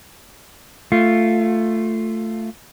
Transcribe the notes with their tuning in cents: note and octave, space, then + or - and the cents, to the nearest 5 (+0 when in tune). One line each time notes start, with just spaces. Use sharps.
A3 +10 F4 +0